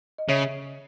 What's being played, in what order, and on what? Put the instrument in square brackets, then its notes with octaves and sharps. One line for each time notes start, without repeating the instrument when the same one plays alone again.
[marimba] D#5
[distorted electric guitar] C#3 [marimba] C#5 E5